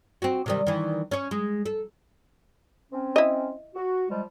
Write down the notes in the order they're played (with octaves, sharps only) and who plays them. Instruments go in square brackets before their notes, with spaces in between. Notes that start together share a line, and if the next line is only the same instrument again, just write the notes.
[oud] C4 F#4
C3 D#3 G3
D#3 E3
C#4 C#5
G#3
A4
[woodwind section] C4 C#4
[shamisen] E4 D#5
[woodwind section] F#4
F3 G3 G#3